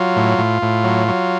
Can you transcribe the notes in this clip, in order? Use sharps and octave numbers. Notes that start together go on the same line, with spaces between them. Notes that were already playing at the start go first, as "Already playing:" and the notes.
Already playing: F#3 F4
A2
A2
A2
F#3
F#3